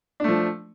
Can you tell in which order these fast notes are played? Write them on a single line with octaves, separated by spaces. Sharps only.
D4 A3 F3